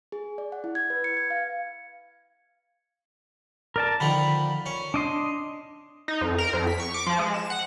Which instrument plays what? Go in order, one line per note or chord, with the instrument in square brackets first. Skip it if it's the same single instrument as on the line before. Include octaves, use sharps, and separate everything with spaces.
[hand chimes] G#4
D5
F#5
E4
G#6
B4
C#7
G#6
F5
[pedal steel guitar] A#4 D5 A5
[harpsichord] D3 D#3 F3 [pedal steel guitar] B5
[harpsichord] C#4
[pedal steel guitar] D4 D#5 C6
[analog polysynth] D#4
F2
A#4
F2
B6
C#6
D6
F3
G#3
E7
F#5